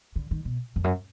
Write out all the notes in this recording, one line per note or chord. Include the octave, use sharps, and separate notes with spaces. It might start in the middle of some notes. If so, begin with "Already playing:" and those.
D3
D#3
B2
F2
F#2